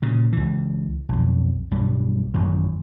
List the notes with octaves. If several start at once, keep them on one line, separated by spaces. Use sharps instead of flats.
A#2 C#3
C#2 E3
B1 F2
B1 G2 G3
A1 F#2 D#3